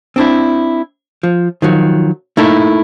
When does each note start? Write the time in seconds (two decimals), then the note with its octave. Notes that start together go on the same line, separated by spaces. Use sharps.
0.16 C4 D4 E4
1.23 F3
1.62 D#3 F3 F#3
2.37 A3 A#3 D#4 E4 A4